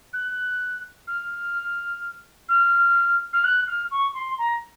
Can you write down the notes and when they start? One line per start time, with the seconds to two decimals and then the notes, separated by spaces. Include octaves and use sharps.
0.13 F#6
1.07 F6
2.49 F6
3.33 F6
3.44 F#6
3.67 F6
3.91 C#6
4.14 C6
4.38 A#5